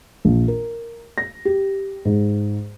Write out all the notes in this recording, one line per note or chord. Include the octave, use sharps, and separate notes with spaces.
A#1
A#4
A#6
G4
G#2